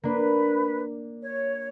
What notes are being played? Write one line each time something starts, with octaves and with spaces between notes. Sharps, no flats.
A#3 D4 B4
C#5